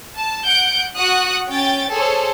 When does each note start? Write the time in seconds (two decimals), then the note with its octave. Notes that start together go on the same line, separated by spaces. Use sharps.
0.16 A5
0.45 F#5 G6 D7
0.97 F#4 F#5 D#6 F#6
1.50 C#4 G5 A6
1.92 G#4 A4 C5 C#5